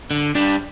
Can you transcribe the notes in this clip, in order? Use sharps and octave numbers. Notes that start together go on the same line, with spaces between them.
D3
G3 D4